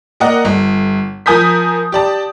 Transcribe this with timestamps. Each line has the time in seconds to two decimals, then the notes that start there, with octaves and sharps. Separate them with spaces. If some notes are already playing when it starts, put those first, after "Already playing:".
0.20 A#3 A#4 D5 D#5 F#5
0.45 G1
1.26 F3 A#4 G#5 D#6 G6 B6
1.92 G4 D5 A5